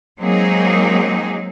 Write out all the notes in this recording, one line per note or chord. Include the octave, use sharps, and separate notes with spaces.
F#3 G#3 A#3 C4 D#4 G#4